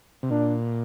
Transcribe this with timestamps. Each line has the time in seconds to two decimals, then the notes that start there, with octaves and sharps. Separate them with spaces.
0.23 C3
0.30 A#2 D4